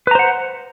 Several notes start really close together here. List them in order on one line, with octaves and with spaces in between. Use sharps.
B4 A#5 C5 F#5